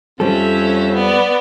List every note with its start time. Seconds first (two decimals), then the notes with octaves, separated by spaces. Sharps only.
0.20 F2 G3 C4 C#4 A4 E5
0.94 B3 D5